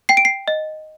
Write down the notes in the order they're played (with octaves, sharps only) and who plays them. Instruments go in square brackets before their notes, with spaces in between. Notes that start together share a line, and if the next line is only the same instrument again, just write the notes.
[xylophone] G5 C7
D7
C7
D#5